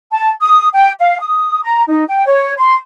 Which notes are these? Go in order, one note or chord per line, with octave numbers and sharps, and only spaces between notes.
A5
D#6
G5
F5
D#6
A#5
D#4
G5
C#5
C6